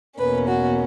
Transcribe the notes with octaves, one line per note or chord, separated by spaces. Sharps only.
E2 B2 A#3 C#4 B4
F#4